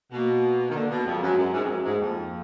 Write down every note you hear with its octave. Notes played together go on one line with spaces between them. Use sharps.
B2 A#3
D#3
D3 A#3
B2
F2 G#3
F#2
F#2
G#2
F2
F#2
G#2
F2 A#3